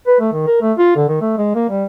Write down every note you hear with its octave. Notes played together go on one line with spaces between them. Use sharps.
B4
A3
D#3
A#4
A3
F4
D3
D#3
A3
G#3
A#3
G3